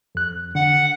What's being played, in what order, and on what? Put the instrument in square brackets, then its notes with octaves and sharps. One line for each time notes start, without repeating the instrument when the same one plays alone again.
[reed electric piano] F2 F#6
[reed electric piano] D3 [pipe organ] F#5